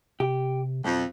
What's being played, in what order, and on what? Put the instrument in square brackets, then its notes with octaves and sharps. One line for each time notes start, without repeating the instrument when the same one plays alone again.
[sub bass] C3 [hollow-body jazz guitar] G4
[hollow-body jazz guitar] B1 [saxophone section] F2